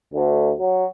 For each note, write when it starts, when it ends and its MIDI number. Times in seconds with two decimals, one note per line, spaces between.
0.13 0.51 38
0.58 0.84 54